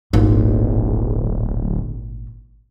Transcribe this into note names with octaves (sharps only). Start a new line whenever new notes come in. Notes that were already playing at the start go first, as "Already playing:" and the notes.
D1 G#1 A#2